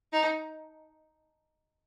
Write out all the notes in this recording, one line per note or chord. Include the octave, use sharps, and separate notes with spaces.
D#4